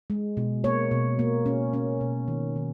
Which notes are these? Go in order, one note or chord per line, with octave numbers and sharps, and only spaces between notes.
G#3
B2
A#3 C#5
B2
A#3
C#4
C#4
B2
D#3
D#3